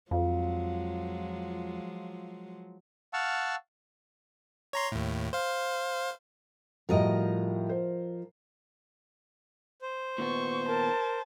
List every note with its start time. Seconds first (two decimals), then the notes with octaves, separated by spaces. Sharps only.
0.11 F2 F3 F#3 G#3 F4 F5
3.13 F5 F#5 A5 C#6 E6 F6
4.73 C#5 A#5 C6
4.92 D#2 A2
5.33 C5 F5
6.89 A2 F3 G3 F#4 A#4 D#5
7.69 C5
9.82 C5
10.18 A#2 D#3 B3 C#6
10.69 A#4 A5